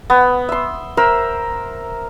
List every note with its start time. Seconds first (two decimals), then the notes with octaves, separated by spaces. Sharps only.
0.10 B3
0.49 E5 C6
0.97 A#4 C5 E5